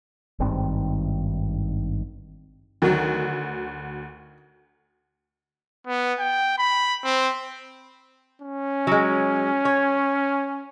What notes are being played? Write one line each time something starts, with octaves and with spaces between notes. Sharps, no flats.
G#1 G2 D#3 C4
D2 D#3 F#3 F#4
B3
G5
B5
C4
C#4
F#3 G#3
C#5